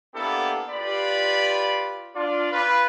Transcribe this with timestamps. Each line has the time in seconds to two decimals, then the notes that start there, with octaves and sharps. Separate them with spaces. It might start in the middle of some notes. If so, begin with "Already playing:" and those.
0.14 A#3 B3 D4 E4 G4 A4
0.70 F4 G4 B4 D5 B5 C6
2.15 D4 F4 D5
2.51 F4 B4